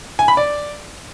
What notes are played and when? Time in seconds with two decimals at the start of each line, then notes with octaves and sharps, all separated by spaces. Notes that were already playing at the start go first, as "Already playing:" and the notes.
0.19 G#5
0.28 B5
0.37 D5